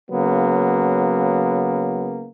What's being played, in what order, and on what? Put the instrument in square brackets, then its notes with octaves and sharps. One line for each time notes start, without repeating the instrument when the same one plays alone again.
[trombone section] C#3 F#3 A#3 B3